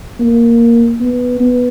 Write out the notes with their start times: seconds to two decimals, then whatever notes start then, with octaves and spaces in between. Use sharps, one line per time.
0.20 A#3
1.00 B3
1.40 B3